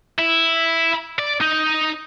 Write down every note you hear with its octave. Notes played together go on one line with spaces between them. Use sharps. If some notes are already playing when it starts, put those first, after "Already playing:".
E4
D5
D#4